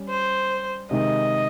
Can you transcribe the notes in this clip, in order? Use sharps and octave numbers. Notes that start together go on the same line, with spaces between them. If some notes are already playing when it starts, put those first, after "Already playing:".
Already playing: G3 C#4
C5
C3 D#3 G#3 D#4 D#5